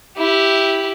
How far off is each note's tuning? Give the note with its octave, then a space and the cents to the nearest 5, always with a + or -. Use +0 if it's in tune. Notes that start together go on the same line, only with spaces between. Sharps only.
E4 -5 G4 -5